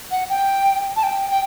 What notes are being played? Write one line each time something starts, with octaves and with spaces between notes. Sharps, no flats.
F#5
G5
A5
G5
G5